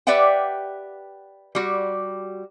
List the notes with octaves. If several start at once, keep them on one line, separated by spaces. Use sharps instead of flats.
G4 B4 D5 E5 F#5 G5
G3 F#4